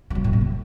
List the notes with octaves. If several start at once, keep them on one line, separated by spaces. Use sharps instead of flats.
E3
F#3
A2
B2
A2